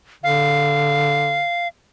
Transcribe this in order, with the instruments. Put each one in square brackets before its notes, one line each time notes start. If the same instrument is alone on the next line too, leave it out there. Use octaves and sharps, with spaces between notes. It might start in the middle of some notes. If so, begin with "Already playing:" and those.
[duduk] D3 [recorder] F5